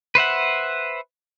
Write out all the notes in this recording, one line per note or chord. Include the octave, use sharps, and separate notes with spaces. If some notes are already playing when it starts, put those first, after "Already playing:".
B4 C5 E5 F#5